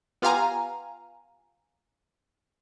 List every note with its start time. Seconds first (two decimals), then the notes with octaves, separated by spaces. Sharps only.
0.22 B3 F4 G4 F5 G#5 A#5